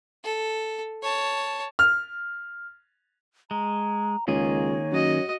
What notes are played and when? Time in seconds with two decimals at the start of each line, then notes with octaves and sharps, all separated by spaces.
0.24 A4
1.02 C#5 A5
1.79 F6
3.51 G#3 A#5
4.28 C#2 D#3 A#3 G#4 C#5
4.92 F#2 F#4 D#5